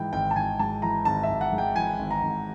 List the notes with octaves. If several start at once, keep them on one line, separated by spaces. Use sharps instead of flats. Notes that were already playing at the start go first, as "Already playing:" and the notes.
Already playing: G#2 E3 G5
G#1 G5
A5
G#1 G#5
G#2 A5
E3 A#5
G#1 A5
E5
G#1
F#5
G#2
G5
E3 G#5
G#1
A#5
G#1